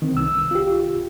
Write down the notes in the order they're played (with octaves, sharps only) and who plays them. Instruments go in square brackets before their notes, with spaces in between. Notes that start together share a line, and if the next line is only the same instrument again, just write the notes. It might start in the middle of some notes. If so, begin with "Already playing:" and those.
[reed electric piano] D#3 C4
C2 E6
F4 G4